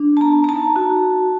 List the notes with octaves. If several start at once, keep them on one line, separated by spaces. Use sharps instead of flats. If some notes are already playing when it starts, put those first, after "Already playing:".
Already playing: D4
A5
B3 A#5
A#5
D#4 A5
F#4